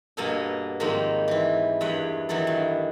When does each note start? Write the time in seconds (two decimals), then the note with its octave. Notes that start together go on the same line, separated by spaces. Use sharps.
0.17 G2 B2 A#3 B3 A4 G#5
0.80 G#2 D#3 F3 G3 A#3 C4
1.28 E3 C4
1.81 E2 G2 B4 C#5 G5
2.29 D#3 E3 F#3 B3 A4
2.47 G2